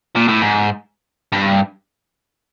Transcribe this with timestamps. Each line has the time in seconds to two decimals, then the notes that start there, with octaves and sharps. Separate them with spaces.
0.16 A#2
0.28 A2
0.42 G#2
1.33 G2